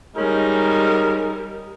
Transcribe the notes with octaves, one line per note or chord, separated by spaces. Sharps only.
G3 G#3 C#4 D#4 A#4